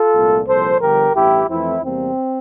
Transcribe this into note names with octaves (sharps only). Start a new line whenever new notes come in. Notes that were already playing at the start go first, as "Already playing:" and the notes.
Already playing: F4 A4
C2 A#2 A3
C2 A#2 F3 A4 C5
G1 G2 D3 F3 G4 A#4
A1 G2 E3 E4 G4
F2 E3 A3 C4 E4
E2 C3 G3 A#3 C4